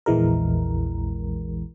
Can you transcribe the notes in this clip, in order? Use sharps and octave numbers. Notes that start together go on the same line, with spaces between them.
A#1 E2 E3 G#3 A#4